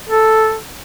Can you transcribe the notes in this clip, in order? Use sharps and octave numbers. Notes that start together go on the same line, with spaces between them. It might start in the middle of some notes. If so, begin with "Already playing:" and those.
A4